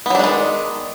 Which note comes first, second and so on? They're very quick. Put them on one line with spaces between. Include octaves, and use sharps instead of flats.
B3 F#3 D4 G#3 D#3